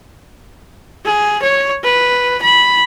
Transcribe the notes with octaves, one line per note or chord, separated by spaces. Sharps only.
G#4
C#5
B4
B5